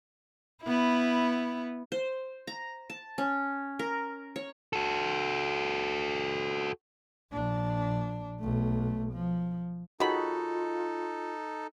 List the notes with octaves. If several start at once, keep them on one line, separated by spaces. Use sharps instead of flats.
B3 E4
C5
A#5
A5
C#4
A#4
C#5
F#4 A4
A#1 D4
B1 A3
F3
D#3 D#4 F4 F#4 G#4 A4 B5